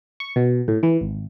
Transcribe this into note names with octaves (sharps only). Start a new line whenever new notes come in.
C#6
B2
A2
E3
G#1